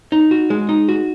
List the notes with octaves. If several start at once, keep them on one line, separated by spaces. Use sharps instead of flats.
D#4
F#4
G#3
D#4
F#4